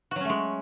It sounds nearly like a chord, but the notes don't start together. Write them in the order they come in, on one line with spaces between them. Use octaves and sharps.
F#4 F#3 C#4 A3 G#3